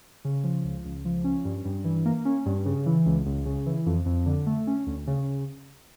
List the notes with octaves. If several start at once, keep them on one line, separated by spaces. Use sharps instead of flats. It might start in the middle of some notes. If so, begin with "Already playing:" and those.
C#3
F3
C#2
C#2
F3
C#4
G2
G2
E3
A#3
C#4
G2
C#3
E3
C#2
C#2
C#3
E3
F2
F2
D3
A3
C#4
D2
C#3